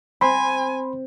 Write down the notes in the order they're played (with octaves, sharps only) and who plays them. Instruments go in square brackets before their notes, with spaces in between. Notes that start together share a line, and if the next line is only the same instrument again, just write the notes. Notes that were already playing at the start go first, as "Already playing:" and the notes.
[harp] C4 [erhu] G#5 [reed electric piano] B5 C6